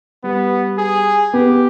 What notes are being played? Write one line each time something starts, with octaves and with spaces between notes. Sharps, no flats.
G3 B3
G#4
B3 G4